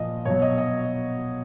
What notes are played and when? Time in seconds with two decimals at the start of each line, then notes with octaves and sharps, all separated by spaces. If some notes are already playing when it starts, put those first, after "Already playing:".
Already playing: A#2 F3 D#5
0.25 B2 F#3 C#5
0.42 D#5
0.58 D#5